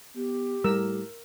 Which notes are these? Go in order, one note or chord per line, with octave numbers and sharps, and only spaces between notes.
B3 G4
A2 G3 A#4 E6